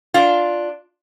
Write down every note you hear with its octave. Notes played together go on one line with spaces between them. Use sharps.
D4 F4